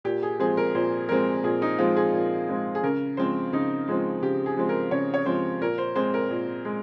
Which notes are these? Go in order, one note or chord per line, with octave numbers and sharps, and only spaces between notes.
A#2 G4
G#4
F3 G#3 C4 G#4
A#4
A#2 C5
F3 G#3 C4 A#4
A#2 G#4
D#4
F3 G#3 C4 F4
G#4
A#2
F3 G#3 C4
G#4
C#3 A#4
F3 G#3 C4 C5
C#3 D#4
F3 G#3 C4
C#3 G4
G#4
F3 G#3 C4
A#4
C#3 C#5
C#5
F3 G#3 C4 C5
A#2 A#4
C5
G#3 C4 C5
A#4
A#2
G#3